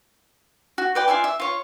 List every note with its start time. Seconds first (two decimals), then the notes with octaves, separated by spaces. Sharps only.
0.78 F#4
0.95 B4 D5 G5
1.08 F4 D5 E5 G#5
1.24 E5
1.40 F4 C#5